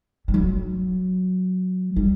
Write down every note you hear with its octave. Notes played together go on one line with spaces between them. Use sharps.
G3
F#3
G3